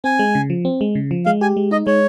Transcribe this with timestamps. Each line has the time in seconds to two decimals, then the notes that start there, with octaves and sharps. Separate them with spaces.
0.04 C4 G#5
0.19 G#3
0.35 C#3
0.50 F3
0.65 C4
0.81 G#3
0.95 C#3
1.11 F3
1.26 G#3 F5
1.41 G4 G#5
1.57 G#3
1.71 D#4 D#5
1.87 G#3 C#5